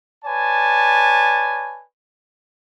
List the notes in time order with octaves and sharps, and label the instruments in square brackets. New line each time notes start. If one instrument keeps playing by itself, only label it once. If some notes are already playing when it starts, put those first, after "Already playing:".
[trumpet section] B4 C#5 D5 G#5 A5